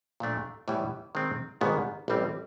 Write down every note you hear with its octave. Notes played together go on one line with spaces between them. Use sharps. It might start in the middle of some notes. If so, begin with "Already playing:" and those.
A#2 F3 A3 D4
A2 E3 G3 B3
D#3 G#3 C4
G#1 G#2 D#3 G3 B3
A1 A2 E3 G3 C4